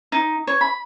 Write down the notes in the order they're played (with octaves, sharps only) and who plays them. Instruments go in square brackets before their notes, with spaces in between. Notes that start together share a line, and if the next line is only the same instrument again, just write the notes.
[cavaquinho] D#4
C#5
B5